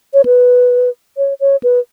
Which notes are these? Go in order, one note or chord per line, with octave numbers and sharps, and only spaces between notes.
C#5
B4
C#5
C#5
B4